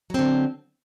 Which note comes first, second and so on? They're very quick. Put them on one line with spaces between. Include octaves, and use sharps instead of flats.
F#3 C4 D3